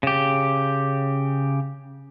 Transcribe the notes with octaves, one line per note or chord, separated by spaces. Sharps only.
C#3 G4